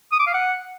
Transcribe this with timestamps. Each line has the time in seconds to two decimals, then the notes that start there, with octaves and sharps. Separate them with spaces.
0.12 D#6
0.20 D6
0.27 F5
0.34 F#5